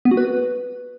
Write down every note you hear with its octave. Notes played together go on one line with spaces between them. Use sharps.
B3
F#4
B4